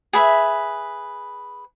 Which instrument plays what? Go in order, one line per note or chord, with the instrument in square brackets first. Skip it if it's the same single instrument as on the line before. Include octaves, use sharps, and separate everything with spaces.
[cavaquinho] G#4 B4 E5